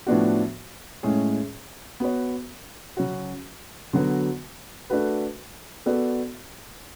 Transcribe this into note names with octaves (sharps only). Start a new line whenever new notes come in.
A2 F3 B3 D4 F#4
A2 G#3 C#4 G#4
B3 F#4 C#5
C#3 F#3 C#4 F#4
D3 F#3 B3 F#4
A3 D4 F#4 B4
B3 F#4 A4 D5